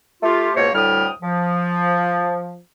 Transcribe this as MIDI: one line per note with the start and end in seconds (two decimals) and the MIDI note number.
0.23 0.50 57
0.23 0.50 65
0.23 0.50 67
0.55 0.68 37
0.55 0.68 47
0.55 0.68 58
0.55 0.68 72
0.55 0.68 73
0.74 1.07 38
0.74 1.07 45
0.74 1.07 55
0.74 1.07 79
0.74 1.07 87
0.74 1.07 89
1.22 2.59 53